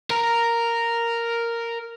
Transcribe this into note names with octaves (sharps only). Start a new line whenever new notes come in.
A#4 A#5